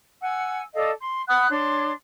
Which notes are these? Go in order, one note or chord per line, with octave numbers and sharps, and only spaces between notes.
F#5 G#5 E6
A4 D5 D#5 F5
C6
F#5 B5 D#6 F#6
D4 C#5 C6